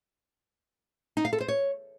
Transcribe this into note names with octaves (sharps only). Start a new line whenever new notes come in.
D#4
F5
A4
C5
C#5